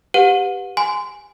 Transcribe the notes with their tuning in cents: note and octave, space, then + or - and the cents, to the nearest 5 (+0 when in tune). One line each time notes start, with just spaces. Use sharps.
G4 +0 B4 +0 F#5 -35
G#5 +0 C6 -25